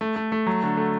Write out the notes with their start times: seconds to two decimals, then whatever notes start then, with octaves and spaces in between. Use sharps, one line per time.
0.01 A3
0.16 A3
0.32 A3
0.46 F#3
0.63 D3
0.77 A3